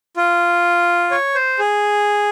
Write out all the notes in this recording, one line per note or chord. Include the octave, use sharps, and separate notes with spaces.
F4
C#5
C5
G#4